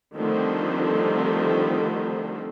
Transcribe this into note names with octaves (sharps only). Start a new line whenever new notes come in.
D3 D#3 F3 G3 A3 C4